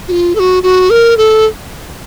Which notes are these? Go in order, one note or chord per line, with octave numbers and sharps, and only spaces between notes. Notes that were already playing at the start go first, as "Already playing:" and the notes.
F#4
F4
A4
F#4
F#4
A#4
A4